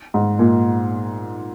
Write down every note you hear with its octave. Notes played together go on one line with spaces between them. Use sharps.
G#2
A#2